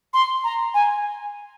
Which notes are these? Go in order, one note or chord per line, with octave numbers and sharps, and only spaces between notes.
C6
A#5
G#5